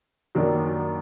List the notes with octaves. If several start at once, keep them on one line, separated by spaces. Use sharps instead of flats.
F#2 D#3 F#3 A#3 D4